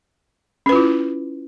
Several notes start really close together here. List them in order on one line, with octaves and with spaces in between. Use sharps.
C#4 B4 F4 E4